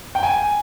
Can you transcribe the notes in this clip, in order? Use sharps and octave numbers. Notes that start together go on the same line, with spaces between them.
G5
G#5